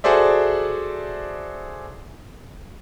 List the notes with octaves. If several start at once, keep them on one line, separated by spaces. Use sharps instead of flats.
F#4 G#4 A4 C5 D5 E5